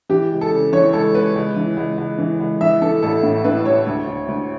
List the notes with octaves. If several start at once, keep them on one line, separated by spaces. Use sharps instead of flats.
E3 G4
C#2
A4
C#3
E3 C#5
C#2 A4
C#2 B4
C#2
E3
C#2
C#2
E3
C#2
E3 E5
E3 A4
A1 A4
A2
A2 B4
A1 C#5
D2
D2
D2